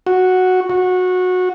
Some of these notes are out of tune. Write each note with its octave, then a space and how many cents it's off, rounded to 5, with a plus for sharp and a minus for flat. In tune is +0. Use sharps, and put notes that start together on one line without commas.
F#4 -5
F#4 -20